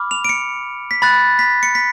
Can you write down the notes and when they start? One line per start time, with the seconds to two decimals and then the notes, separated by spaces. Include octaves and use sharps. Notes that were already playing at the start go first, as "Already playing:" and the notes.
Already playing: B5 D6 F6
0.11 F7
0.25 D7
0.29 C#7
0.91 B6
1.02 B5 F#6 A6
1.39 B6
1.63 C#7
1.75 B6